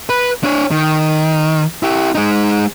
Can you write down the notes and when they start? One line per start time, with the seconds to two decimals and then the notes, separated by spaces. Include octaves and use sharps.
0.09 B4
0.43 D4 C#5
0.71 D#3
1.83 E4 G4
2.15 G#3 D#4